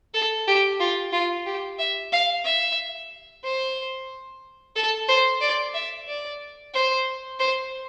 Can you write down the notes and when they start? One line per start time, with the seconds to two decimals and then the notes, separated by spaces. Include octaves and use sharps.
0.14 A4
0.47 G4
0.80 F4
1.12 F4
1.46 G4
1.79 E5
2.12 F5
2.44 E5
3.44 C5
4.76 A4
5.08 C5
5.41 D5
5.74 E5
6.07 D5
6.74 C5
7.39 C5